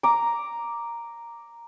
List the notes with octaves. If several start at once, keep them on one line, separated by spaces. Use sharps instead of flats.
A#5 D6